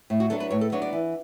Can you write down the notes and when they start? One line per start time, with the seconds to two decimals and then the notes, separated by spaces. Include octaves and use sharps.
0.10 A2
0.20 F#4
0.30 F#3 B3 D4 A4
0.40 B4
0.50 A2 C#5
0.61 A4
0.72 F#3 B3 D4 C#5
0.82 D5
0.93 E3